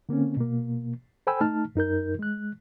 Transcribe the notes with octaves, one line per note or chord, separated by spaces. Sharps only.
D3 A#3 C4 C#4
B2 A#3
A4 C5 G5 G#5 B5 E6
A3 D#4 A5 F6
F#2 D#4 A#4 G6
G#3 F#6